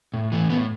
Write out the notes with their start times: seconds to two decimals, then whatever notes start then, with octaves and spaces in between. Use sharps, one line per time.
0.14 A2
0.32 E3 A3
0.50 A2 B3